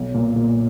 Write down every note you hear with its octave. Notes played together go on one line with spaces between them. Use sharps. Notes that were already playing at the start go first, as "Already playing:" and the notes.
Already playing: B1
A#2
A#2